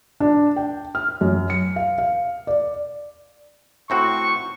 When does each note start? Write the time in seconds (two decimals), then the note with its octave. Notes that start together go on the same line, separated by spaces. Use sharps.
0.20 D4
0.56 G5
0.95 F6
1.21 F#2
1.50 C#7
1.76 F5
1.98 F5
2.47 D5
3.90 A2 C4 F#4 C#6